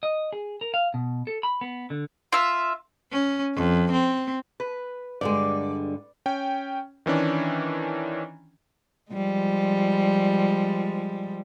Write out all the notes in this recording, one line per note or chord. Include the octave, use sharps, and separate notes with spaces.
D#5
G#4
A#4
F5
B2
A4
B5
B3
D3
F4 E5
C#4
F2
C4
B4
G2 D3 G#3 D5
C#4 G5
D#3 E3 C#4 D4
F3 G3 G#3